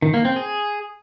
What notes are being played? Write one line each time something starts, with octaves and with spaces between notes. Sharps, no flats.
D#3
A#3
C4
G#4